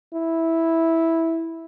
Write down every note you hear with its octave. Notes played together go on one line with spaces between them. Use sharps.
E4